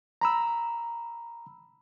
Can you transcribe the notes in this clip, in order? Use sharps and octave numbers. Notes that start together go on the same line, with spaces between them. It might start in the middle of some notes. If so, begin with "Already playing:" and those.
A#5 B5 E6